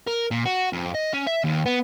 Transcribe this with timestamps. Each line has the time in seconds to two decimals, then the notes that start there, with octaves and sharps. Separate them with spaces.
0.07 A#4
0.31 A#2
0.45 F#4
0.73 F2
0.94 D#5
1.13 C#4
1.27 E5
1.44 D#2
1.66 B3